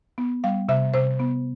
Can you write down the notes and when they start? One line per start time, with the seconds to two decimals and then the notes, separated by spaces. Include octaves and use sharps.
0.18 B3
0.44 G3 F5
0.69 C3 E5
0.94 C3 C5
1.20 B3